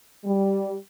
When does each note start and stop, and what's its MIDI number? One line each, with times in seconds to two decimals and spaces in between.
0.25 0.75 55